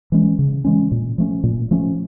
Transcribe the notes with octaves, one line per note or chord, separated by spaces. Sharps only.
E3 G#3 C#4
C#3
E3 G#3 C#4
A#2
F3 A3 C#4
A#2
F3 A3 C#4